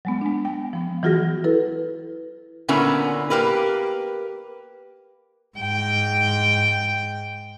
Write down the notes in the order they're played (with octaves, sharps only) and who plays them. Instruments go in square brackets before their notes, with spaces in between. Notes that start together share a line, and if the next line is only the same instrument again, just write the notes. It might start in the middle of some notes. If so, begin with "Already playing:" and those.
[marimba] F#3 G#3 B3
G#3 D4
G5
F3 B3
E3 F#3 F4 F#4 G#4 A#6
E4 A4 B4
[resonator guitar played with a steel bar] A#2 D3 B3 C#4 E4 A#4
A#3 G4 A#4 B4
[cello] G#2 G5